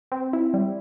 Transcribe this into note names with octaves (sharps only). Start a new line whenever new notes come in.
C4
E4
G3